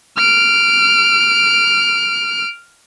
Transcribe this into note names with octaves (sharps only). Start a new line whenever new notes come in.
F6 D7